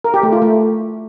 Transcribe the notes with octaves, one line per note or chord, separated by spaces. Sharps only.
A#4
G4
A3
F4
A3